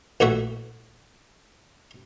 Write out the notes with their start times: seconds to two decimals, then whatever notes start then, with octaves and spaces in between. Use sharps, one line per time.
0.20 A#1 A2 E3 F#4 E5 F#5